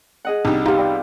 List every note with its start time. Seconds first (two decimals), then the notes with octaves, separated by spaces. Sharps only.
0.25 G#4 D#5 F#5
0.45 C2 G3 D4 D#4
0.66 B3 D#4 F4 G4
0.78 D5 G5 B5